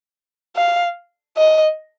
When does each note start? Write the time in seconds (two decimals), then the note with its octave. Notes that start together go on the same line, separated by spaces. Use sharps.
0.56 F5
1.37 D#5